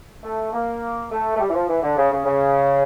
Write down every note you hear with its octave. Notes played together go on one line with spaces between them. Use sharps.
A3
A#3
A3
A3
G3
E3
F3
E3
D3
C#3
C#3
C#3